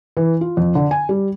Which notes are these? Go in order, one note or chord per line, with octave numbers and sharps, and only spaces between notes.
E3
F4
F2
D3
G#5
G3